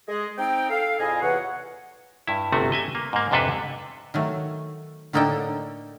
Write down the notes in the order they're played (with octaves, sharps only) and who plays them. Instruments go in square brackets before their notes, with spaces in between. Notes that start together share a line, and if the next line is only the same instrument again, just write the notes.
[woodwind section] G#3 G#4 D#5
C4 D#4 G5
A4 F5
F2 A#2 E4 G#4 D#5 G#5
E2 C3 E3 C#5 F#5
[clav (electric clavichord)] G2 E4
G1 C3 A3 F#4
D#5 E5 G#5
A#3
G#2 A#3
F2 G#2 C3 D4 A4 B4
[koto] D#3 F#3 A3
A2 D3 A#3 D#4 A4 G5